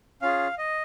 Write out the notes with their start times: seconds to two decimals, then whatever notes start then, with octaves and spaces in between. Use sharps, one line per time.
0.22 C#4 F4 G#4 F5
0.58 D#5